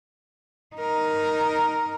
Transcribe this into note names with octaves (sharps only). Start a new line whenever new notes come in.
D#4 A#4